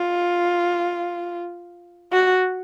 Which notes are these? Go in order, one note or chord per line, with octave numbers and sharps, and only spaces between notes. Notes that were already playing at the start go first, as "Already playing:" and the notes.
Already playing: F4
F#4